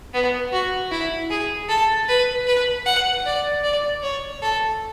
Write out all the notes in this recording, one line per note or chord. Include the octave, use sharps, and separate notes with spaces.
B3
F#4
E4
G#4
A4
B4
B4
F#5
D5
D5
C#5
A4